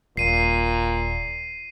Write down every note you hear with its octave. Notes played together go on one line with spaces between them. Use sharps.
D#1 A#2 C7 D#7